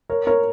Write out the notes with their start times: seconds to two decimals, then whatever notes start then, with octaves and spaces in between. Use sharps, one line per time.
0.10 A#4 C#5
0.27 A#4 C#5